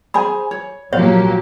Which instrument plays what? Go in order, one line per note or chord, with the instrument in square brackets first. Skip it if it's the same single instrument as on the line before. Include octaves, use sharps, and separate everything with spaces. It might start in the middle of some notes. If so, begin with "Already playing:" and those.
[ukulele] G#4 C5 G#5 [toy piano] B5
[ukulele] C#5
[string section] A#2 F3 G4 [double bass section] F#3 A#3 [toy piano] C#5 [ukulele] F5